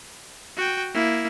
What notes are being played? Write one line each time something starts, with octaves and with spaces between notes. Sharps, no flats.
F#4 G5
A#3 E4